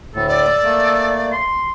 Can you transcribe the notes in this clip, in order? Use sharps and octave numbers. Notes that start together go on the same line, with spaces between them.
D2 A2 A4
A4 D5
A3 A#3
C6